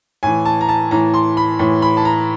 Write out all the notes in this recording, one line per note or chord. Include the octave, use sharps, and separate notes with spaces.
A2 E3 G#5
A5
A#5
A5
A2 E3 A#5
C6
B5
A2 E3
B5
A5
A#5